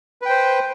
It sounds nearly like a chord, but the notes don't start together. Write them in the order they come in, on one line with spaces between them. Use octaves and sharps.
B4 G5 C5